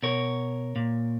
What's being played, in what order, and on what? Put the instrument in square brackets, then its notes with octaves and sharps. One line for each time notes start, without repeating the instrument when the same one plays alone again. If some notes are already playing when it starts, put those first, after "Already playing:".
[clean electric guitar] B2 A#4 C#5
A#2